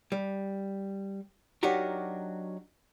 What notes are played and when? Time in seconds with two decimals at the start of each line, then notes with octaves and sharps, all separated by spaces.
0.12 G3
1.63 F#3 D4 D#4 F#4 G4 A#4